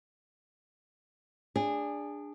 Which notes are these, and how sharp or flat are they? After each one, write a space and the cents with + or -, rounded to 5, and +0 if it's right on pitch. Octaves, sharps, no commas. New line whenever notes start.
D4 +0 G#4 -20